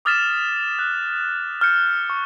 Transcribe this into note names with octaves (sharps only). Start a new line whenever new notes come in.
D6 D#6 F6 A6 B6 E7
F#6
F6 G6 C#7
C#6